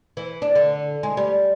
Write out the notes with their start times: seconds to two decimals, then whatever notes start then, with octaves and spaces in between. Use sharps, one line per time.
0.17 E3
0.42 D4
0.55 D3
1.03 G#3
1.17 G3